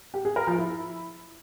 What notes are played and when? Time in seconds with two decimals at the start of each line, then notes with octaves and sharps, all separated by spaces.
0.14 G4
0.25 G#4
0.36 A#4
0.47 F3
0.58 E4